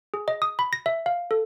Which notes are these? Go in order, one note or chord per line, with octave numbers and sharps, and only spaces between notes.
G#4
D#5
D#6
B5
A#6
E5
F5
A4